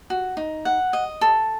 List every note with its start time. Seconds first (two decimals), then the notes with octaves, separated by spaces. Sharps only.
0.10 F#4
0.37 D#4
0.65 F#5
0.93 D#5
1.21 A4